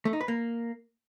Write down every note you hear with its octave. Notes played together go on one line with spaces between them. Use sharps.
A3
D#4
B4
A#3